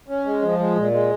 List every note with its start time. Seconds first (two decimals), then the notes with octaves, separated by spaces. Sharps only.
0.08 C#4
0.25 G#3
0.42 F3
0.59 G#3
0.76 A#2
0.92 G#3